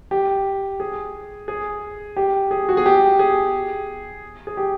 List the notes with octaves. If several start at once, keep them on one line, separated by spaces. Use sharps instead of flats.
G4
G#4
G#4
G4
G#4
F#4
G#4
G4
G#4
G#4
G4